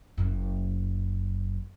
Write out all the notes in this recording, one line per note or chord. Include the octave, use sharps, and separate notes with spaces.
F#1 F#2